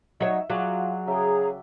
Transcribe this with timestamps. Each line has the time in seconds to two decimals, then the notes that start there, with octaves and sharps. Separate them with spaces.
0.20 F#3 D#4 C#5 E5 E6
0.50 F#3 F4 F#4 G#4 D5
1.07 C#3 G#4 E5 G5 A#5